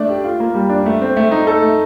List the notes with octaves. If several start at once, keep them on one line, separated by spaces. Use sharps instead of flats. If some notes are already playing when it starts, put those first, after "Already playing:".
Already playing: A3 D4 D5
G4
F4
A#3
G3
D4
A3
C4
A3
D#4
A4
A3